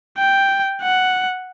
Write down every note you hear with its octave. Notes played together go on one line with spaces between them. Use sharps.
G5
F#5